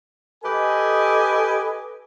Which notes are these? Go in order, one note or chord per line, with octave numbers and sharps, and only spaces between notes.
G4 A4 B4 D#5 G#5